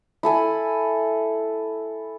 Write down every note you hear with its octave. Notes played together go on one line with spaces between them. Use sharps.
E4 A4 G#5